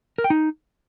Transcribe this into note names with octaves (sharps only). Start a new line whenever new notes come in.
A#4
G5
D#4